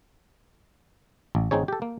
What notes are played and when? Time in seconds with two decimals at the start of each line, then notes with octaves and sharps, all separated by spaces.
1.35 A1
1.51 A1 C4 D#4 G#4 C#5
1.68 G4 A4
1.82 A#3